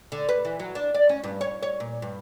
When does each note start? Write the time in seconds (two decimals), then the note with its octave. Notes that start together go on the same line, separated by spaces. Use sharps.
0.12 D3
0.29 B4
0.45 E3
0.60 F#3
0.75 D4
0.94 D5
1.09 C#4
1.24 G2
1.41 C#5
1.63 C#5
1.80 A#2
2.02 G2